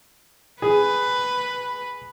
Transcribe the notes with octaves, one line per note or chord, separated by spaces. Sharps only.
G#4 B4